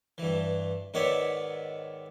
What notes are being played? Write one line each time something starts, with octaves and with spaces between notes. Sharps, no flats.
G2 E3
G#2 D#3 B3 C#5 D5 E5